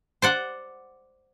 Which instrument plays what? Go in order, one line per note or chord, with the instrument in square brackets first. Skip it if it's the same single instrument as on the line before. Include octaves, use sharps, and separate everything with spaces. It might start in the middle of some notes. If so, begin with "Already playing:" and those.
[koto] C5 D5 F#5